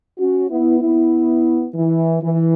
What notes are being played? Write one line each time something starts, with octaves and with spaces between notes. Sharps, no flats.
C#4 F#4
B3 E4
B3 E4
E3
E3